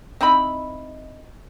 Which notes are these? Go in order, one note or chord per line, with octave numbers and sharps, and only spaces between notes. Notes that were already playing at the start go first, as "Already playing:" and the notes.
C4 D#4 E4 B5